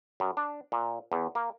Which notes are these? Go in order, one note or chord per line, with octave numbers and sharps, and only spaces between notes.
F#2
D4
A#2
E2
A#3